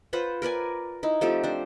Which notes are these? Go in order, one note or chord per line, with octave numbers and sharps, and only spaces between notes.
F4 B4 C5 F#5
A#4 B4 D5 G#5
D#4 E4
F3 A3 C4 G4
D4 C5